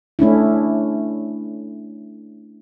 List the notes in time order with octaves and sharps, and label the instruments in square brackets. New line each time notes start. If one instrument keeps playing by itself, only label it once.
[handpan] A3 C#4 D4 E4